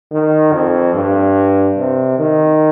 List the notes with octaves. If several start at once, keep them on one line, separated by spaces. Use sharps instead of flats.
D#3
F2
G2
C3
D#3